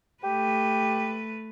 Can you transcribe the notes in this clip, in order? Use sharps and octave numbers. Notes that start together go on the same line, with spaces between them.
A3 G4 B4